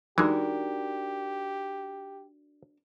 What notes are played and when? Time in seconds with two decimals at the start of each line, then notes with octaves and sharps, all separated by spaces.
0.18 E3 G#3 D4 D#4 F#4 G4 A#4